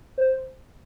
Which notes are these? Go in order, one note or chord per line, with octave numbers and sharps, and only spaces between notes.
C5